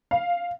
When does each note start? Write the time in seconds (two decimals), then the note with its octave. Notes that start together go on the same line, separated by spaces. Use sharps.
0.11 F5